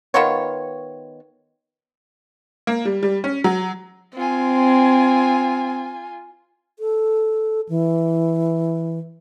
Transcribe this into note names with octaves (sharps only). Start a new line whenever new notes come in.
D#3 B3 F4 C#5
A#3
G3
G3
C#4
F#3
C4 F4 G#5
A4
E3